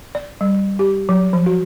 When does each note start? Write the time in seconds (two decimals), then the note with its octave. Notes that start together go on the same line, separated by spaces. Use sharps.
0.15 D5
0.41 G3
0.79 G4
1.09 F#3
1.33 F3
1.46 F#4